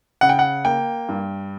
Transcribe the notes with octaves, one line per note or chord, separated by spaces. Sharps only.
C#3 F#5
G5
F#5
A#3 G5
G2